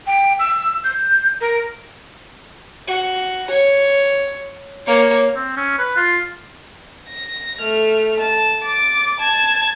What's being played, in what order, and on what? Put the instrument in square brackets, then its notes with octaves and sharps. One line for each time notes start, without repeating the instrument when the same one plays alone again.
[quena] G5
E6
G6
A#4
[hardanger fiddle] F#4
C#5
A#3 C#5
[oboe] C4
C#4
B4
F4
[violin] A#6
A3 F6
A5
D6 A6
A5 G#6